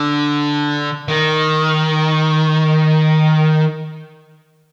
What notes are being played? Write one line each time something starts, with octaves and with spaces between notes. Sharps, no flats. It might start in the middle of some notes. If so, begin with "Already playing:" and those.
Already playing: D3
D#3